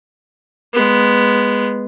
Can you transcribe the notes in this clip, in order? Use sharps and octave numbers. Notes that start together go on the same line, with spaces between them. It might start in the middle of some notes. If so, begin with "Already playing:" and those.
G#3 B3